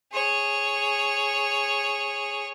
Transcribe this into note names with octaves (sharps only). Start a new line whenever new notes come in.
G#4 C#5